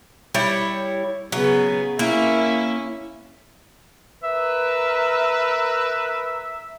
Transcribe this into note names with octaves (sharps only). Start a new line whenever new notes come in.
G3 E4 C#5
C#3 F#3 B3 G#4
A#3 C#4 E4
A#4 B4 E5